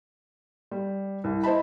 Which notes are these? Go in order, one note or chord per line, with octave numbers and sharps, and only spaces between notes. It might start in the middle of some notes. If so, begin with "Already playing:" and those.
G3
C2
E4 C5 D#5 A5 B5